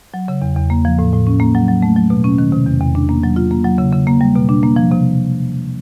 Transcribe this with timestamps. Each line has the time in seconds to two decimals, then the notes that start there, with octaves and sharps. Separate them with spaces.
0.14 F#3
0.28 C#3
0.42 E2
0.56 E2
0.70 A#3
0.85 F3
0.99 A2
1.13 A2
1.27 C#4
1.40 A#3
1.55 F#3
1.68 F#3
1.82 A3
1.96 F#3
2.10 B2
2.24 C#4
2.38 D#3
2.52 C3
2.67 E2
2.81 E2
2.95 D4
3.09 A#3
3.23 F#3
3.36 F4
3.51 A#3
3.65 F#3
3.78 C#3
3.93 C#3
4.07 A#3
4.21 G3
4.36 B2
4.49 D4
4.63 A#3
4.76 F3
4.91 C3